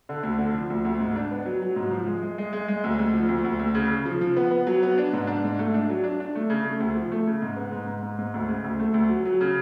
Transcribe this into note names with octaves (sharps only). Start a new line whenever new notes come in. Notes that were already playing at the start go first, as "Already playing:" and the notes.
D3
D2
D3
F3
D2
D2
G#2
D4
B3
F#3
F#3
G#2
F3
G#3
G#3
G#3
G#3
G#3
D2
D2
F3
D2
D2
D2
C#3
C#3
F3
F3
B3
B3
F#3
B3
D4
G#2
D4
G#2
A3
D4
F#3
D4
D4
A3
C#3
A3
D2
F3
A3
C#3
G#2
B3
G#2
G#2
G#2
G#2
D2
C#3
D2
A3
D2
F#3
F#3
C#3